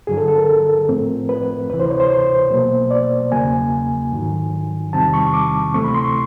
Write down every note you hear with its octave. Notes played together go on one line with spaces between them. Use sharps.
G2 D3 F#3 G#4
A4
A4
A#4
A2 F3 A3 C4
B4
D2 C3 E3 B4
C5
C#5
C5
C5
B2 F#3 A#3
D5
E2 C#3 F#3 A#3 G#5
G#2 D#3 F#3
E2 C3 D#3 G3 C4 A5
C#6
C#6
D6
D2 C3 E3 A3 C4 C#6
B5
C6
C#6